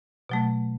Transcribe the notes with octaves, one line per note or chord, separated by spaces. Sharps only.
B2 F#3 A3